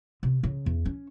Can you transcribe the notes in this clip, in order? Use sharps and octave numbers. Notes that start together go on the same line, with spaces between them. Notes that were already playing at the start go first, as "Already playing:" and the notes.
C3
C#3
E2
C#4